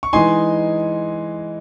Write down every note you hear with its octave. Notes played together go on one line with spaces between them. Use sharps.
C#6
E3 G#3 D#4 G#5 C6